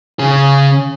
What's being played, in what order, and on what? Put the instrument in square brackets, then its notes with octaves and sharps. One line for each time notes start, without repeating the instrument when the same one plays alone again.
[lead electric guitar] C#3 G#4